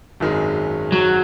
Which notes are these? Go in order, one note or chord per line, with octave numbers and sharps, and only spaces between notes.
G#1 F#2 D#3 G#3
F#3